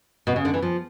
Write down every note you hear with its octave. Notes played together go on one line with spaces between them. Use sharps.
B2
C#3
D3
E3
F3